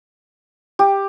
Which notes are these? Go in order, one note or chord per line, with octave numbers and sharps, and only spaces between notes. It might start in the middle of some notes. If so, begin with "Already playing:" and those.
G4